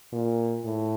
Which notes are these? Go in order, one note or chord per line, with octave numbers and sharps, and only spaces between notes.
A#2
A2